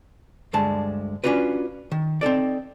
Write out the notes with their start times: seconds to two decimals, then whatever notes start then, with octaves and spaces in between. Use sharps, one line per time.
0.53 D2 G2 D3 G#3 A5
1.24 C#4 D4 F4 F#4 B4
1.91 D#3
2.21 C4 D#4 A4 D5